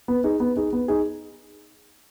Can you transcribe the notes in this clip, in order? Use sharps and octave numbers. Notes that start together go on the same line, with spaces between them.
B3
D#4 G#4
B3
D#4 G#4
B3
D#4 G#4